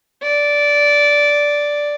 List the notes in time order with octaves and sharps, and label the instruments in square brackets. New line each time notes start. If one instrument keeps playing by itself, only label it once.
[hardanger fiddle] D5